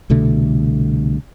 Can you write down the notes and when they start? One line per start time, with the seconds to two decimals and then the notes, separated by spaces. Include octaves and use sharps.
0.10 C2 B2 D3 A3